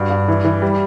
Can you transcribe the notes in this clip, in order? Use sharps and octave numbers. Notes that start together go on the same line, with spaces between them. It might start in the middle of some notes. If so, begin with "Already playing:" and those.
Already playing: G2 F#4
G2
E3
E3
G3